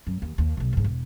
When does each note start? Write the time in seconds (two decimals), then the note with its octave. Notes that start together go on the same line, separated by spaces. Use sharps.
0.07 F#2
0.22 D#2
0.38 D#2
0.57 B1 B2
0.73 F2 G#2
0.84 E1